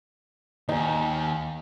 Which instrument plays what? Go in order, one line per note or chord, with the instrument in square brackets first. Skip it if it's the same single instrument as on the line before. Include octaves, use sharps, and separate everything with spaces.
[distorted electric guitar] D#2 [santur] D#4 G#5